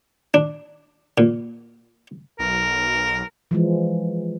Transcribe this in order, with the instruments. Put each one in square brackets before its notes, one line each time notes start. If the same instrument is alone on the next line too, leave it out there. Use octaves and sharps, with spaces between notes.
[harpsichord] D4
A#2
[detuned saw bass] B1 [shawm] A#4
[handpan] E3 F3 G#3